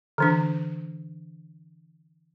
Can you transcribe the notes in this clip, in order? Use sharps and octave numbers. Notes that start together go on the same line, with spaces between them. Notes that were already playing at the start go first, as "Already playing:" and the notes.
D3 E3 D4